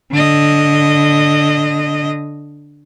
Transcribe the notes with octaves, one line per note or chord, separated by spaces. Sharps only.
D3 D#5